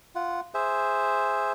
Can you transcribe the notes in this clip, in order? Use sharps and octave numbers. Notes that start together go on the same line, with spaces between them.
F4 F#5
G#4 C5 E5